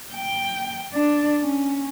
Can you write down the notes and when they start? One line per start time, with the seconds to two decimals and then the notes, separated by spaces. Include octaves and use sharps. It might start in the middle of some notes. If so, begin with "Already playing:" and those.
0.14 G5
0.93 D4
1.42 C#4